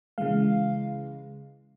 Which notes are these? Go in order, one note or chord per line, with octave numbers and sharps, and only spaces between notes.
C#3 E3 G#3 F5